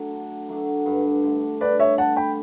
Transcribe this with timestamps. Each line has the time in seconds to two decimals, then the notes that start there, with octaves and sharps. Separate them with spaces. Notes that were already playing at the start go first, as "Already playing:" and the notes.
Already playing: F#3 A3 D4
0.10 D3
0.49 F#3 A3 D4
0.86 G2
1.24 D3 A3
1.60 G2 B4 D5
1.79 C#5 E5
1.97 D3 A3 F#5 A5
2.16 G5 B5